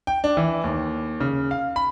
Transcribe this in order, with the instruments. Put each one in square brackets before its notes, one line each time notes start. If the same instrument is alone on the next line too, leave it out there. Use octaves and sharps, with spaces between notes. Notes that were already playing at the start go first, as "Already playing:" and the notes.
[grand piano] G5
D4
E3
D#2
C#3
F5
B5